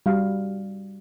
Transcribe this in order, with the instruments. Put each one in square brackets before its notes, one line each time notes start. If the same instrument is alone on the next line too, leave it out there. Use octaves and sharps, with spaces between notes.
[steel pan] G3 F#4 F5